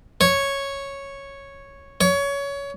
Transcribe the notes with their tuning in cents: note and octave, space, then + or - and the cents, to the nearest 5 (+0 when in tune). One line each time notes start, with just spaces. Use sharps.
C#5 -5
C#5 +20